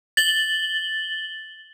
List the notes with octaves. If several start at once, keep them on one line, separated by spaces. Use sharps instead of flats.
A6 F#7 G7